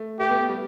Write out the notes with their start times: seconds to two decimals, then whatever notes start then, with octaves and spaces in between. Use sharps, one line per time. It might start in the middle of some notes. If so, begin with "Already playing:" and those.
Already playing: A3
0.20 A3 G4
0.30 B3
0.39 A3
0.49 G3